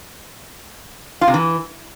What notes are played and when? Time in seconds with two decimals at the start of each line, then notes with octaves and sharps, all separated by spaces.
1.21 F4
1.28 C3
1.34 E3